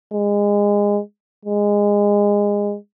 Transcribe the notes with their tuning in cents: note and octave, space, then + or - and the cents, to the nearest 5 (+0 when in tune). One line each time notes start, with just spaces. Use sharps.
G#3 -25
G#3 -20